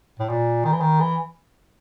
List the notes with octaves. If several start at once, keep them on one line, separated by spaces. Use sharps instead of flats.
A2
A#2
D#3
E3
D#3
E3